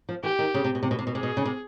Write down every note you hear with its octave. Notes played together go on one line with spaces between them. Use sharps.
F3
E3 G4
D#3
C#3
C3
B2
C3
B2
C3
B2
C3 G#4
B2
C#3
C3